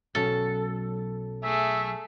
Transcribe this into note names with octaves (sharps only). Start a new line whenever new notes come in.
B1 F#3 C#4 A4
A3 G#4 E5